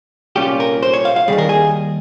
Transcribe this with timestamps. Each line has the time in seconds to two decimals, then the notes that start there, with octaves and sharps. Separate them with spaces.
0.36 C2 A#2 G3 C#4 F4 G4
0.60 A#4
0.83 C5
0.94 C#5
1.05 F5
1.16 F5
1.28 C#3 G3 G#4
1.33 D#2
1.38 A#4
1.49 G#4